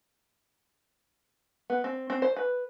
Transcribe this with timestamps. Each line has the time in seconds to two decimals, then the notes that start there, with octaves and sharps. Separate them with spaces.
1.70 B3
1.84 C4
2.10 C4
2.22 C5
2.36 B4